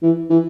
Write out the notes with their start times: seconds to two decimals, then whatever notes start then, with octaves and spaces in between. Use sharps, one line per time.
0.02 E3
0.30 E3